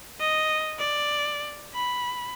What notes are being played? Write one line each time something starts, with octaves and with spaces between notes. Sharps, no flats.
D#5
D5
B5